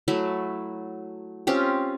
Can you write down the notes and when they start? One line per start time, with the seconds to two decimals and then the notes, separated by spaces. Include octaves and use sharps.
0.08 F#3 A3 E4
1.47 C4 C#4 F4 G4